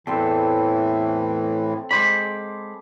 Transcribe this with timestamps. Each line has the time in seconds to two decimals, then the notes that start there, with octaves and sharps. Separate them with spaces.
0.07 E2 A2 E3 C4 A4
1.91 G#3 C5 B5 D6